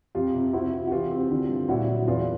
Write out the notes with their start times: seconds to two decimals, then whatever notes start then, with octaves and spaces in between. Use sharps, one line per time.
0.15 F2 F4 G4
0.34 C3
0.53 C4 E4 F#4
0.73 C4
0.87 F#4
0.92 E3 F4 G4
1.11 C4
1.30 D3
1.49 G2
1.69 A#2 E4 F#4
1.88 F#3
2.08 E2 F4